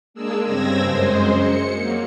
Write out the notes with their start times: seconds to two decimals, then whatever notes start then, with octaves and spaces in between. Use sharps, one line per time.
0.14 G#3 A#3 D4 G#4 E6
0.44 G2 C#3 C4 E6 G#6 A#6
0.82 F#2 G#3 C5
1.36 C#7
1.73 F#3 A#3